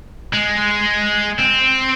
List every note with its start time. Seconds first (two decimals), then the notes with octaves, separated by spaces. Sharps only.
0.33 G#3
1.39 C4